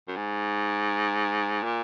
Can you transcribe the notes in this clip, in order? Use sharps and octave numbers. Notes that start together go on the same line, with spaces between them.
F#2
G#2
A#2